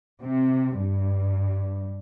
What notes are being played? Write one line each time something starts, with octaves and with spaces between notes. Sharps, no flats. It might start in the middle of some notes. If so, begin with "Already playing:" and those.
C3
G2